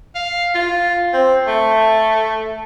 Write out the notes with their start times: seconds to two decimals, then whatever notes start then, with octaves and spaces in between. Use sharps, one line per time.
0.15 F5
0.54 F4
1.13 C4
1.47 A3